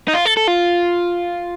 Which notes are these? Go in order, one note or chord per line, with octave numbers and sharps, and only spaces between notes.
D#4
F4
A4
A4
F4